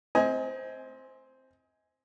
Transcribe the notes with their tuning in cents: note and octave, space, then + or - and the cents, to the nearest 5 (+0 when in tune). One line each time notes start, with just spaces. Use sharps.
C4 +0 D#5 +30 G#5 +0